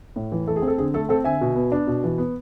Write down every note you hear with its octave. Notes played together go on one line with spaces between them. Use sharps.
A2
E3
A3 A4
G#4
C4
A4
D3 G#4
A3 A4
C4 A4
D3 E5 G#5
B2
B3
D4
B2
E3
B3